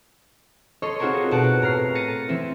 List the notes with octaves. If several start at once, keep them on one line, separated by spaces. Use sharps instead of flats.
A4 C#5 D#5 C6 C#6
C4 D#4 F4 F#4 G#4 A#4
B2 F#4 C#5 A5 F#6 D7
A2 A#5 F6 C7
A6 A#6 C#7 D#7
E3 C4 E4